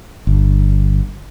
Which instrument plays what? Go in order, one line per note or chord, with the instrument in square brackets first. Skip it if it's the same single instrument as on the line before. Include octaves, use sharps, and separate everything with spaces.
[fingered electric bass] G1